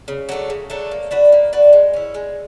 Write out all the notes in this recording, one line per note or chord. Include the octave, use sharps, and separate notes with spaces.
C#3
F#3 A3 D4
C#3
F#3 A3 D4
A#3
D4 F#4 B4
A#3
D4 F#4 B4
G#3
C#4 E4
G#3